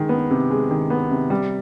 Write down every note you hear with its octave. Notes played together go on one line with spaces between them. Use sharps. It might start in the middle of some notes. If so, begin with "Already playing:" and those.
Already playing: D#3 G#3
B3
C3
G#3
D#3
B3
C3
G3